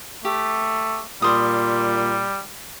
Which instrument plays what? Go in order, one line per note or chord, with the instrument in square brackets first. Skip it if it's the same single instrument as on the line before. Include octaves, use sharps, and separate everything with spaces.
[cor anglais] A3 [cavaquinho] G4
[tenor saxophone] A#2 [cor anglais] G3 [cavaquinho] C6 D#6